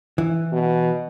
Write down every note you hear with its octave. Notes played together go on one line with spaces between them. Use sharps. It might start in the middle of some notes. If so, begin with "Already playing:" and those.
E3
B2